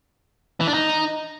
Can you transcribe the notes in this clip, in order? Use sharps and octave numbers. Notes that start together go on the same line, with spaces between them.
E3
D4
D#4